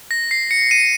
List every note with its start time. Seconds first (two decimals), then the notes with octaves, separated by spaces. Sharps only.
0.11 A#6
0.31 C7
0.51 C#7
0.71 D#7